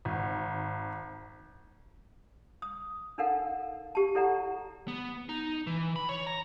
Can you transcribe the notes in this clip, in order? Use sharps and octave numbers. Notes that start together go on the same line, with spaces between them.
G#1
D#6
D4 D#4 A4 A#4 F5 F#5
G4 A5
E4 A4 D5 F#5 A#5
B3
D#4
E3
B5
C#5
A#5